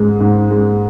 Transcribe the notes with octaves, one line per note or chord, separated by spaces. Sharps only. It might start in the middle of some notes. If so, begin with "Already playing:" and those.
Already playing: G#2 G#3
G#2
G#3